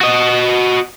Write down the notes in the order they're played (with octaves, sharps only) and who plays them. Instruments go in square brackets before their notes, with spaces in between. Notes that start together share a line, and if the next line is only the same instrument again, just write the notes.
[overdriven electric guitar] F#4 D#5